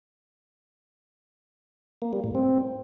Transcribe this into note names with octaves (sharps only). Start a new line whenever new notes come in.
A#3
G3
A2
C4